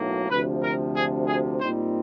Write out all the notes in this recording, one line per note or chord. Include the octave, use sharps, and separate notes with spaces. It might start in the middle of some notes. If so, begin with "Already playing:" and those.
Already playing: B1 A2 F#3 A#3
D2 C3 F3 B4
A#4
G#4
G#4
A#2 G3 C4 D#4 C5